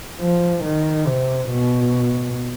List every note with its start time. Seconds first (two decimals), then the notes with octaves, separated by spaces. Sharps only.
0.20 F3
0.64 D#3
1.07 C3
1.51 B2